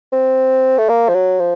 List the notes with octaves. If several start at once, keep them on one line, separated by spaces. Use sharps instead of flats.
C4
A3
A#3
F3
F#3
F3